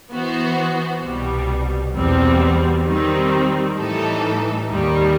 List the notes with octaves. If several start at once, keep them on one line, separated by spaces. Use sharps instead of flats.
E3 B3 F#4 C5
C2 B2 G3
E2 B2 G3 C4
D#3 G3 C4
A2 E3 G3 D#4 A4
D#2 D#3 G3